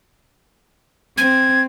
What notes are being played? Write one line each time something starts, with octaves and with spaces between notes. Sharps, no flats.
C4 G#6